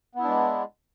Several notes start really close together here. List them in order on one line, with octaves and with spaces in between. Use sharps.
B3 E4 D4 G#3